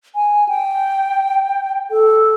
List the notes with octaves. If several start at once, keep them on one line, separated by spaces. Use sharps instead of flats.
G#5
G5
A4